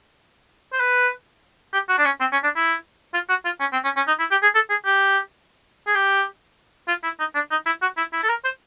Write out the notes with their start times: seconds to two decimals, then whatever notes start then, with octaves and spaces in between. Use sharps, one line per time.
0.73 C5
0.80 B4
1.74 G4
1.89 F#4
1.99 D4
2.05 C#4
2.21 C4
2.32 C#4
2.44 D4
2.56 E4
3.14 F4
3.29 F#4
3.45 F4
3.60 C#4
3.73 C4
3.84 C#4
3.97 C#4
4.08 D#4
4.20 E4
4.31 G4
4.43 G#4
4.55 A4
4.70 G#4
4.85 G4
5.87 G#4
5.95 G4
6.88 F4
7.04 E4
7.20 D#4
7.35 D4
7.51 D#4
7.66 E4
7.82 F#4
7.98 E4
8.13 E4
8.23 A4
8.29 A#4
8.44 C5